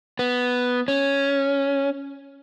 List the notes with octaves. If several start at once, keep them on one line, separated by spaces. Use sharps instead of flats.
B3
C#4